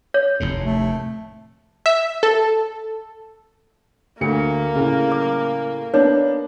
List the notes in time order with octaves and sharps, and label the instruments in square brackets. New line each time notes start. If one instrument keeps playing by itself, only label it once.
[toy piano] C#5
[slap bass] F1 D#2 A2
[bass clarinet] A3
[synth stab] E5
A4
[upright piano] D2 C#7 [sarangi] A#3
[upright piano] A2 C#3
[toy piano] D6
[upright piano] A#3 B3 D4 [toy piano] D#4 C#5